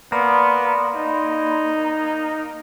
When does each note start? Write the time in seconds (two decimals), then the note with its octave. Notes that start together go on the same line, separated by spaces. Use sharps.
0.12 A#3 B3 D5 B5 C6
0.95 D#4